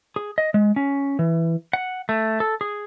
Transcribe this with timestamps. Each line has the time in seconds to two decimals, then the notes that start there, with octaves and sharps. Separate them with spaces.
0.16 G#4
0.38 D#5
0.54 G#3
0.76 C#4
1.19 E3
1.73 F#5
2.09 A3
2.40 A4
2.61 G#4